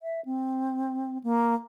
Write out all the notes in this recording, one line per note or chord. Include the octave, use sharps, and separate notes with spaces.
E5
C4
A#3